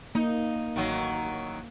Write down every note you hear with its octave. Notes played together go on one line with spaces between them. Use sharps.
A#3 D#4
A1 D#3 F#3